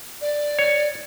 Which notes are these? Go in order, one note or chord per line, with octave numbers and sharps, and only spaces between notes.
D5
C#5